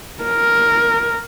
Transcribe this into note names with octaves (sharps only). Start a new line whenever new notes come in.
A#4